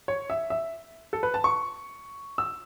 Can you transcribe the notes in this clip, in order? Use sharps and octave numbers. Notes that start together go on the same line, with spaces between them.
C#5
E5
E5
A4
B4
A5
C#6
E6